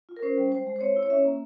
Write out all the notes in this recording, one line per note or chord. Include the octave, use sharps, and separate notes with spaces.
F4
A#4
C#4 C5
G3
G#3 C5
G#3
C5
C4 C#5
E4
C#5
C#4 E5
A#3